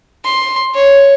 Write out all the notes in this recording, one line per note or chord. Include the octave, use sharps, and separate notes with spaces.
C6
C#5